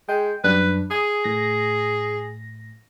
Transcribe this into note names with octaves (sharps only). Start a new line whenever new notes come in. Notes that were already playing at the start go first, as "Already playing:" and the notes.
G#3 G5
F#2 G3 D4 B4
G#4 G#5 D#6
A2 A#6